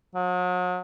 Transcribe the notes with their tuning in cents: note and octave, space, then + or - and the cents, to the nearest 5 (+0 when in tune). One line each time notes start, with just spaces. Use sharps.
F#3 -40